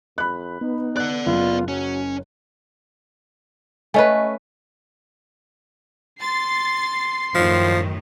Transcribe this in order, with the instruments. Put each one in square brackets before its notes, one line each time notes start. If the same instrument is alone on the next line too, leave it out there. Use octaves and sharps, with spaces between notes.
[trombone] F2 [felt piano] B5 F#6
[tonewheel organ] B3 [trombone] D#4
[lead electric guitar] D5 F#5 [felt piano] F#6
[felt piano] F#1 [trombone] F4
[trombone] F#3 [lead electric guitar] C#4
[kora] A3 C#4 B4 [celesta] D#5 G#5
[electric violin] C6 C7 [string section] A6
[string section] F#2 A2 D#3 [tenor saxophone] F3